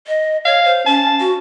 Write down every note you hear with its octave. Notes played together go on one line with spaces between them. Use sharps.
D#5
C#5 F5
C5
C#4 A5
F#4